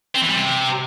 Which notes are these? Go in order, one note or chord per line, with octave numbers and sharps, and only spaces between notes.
C4
E3
G3
C3